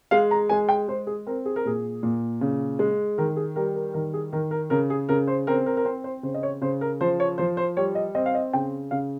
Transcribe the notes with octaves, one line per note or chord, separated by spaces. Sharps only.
G#3 F5
A#5
G#3 G#5
G5
G#3 C5
G#4
C4 A#4
G#4
A#4
A#2 G#4
A#2
C#3
G#3
D#3 A#4
G#4
G3 A#4
A#4
D#3 A#4
G#4
D#3 A#4
A#4
C#3 A#4
G#4
C#3 A#4
C5
C4 A#4
A#4
A#4
C4 C5
C5
C#3 C5
D#5
C#5
C#3 C5
A#4
F3 C5
C#5
F3 C5
C5
G3 C#5
D#5
C4 D#5
F5
D#5
C#3 G5
C#3 F5